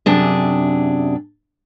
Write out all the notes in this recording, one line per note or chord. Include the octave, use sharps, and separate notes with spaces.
F#2 C3 D4 G#4